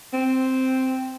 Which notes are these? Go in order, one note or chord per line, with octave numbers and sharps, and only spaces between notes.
C4